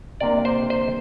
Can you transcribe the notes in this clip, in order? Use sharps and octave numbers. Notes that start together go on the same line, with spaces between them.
C3 A#3 D4 D5
C5
C5